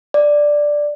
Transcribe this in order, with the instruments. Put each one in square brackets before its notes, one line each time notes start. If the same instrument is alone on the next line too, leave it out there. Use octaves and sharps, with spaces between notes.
[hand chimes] D5